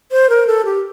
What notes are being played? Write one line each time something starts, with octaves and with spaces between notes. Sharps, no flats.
C5
A#4
A4
G4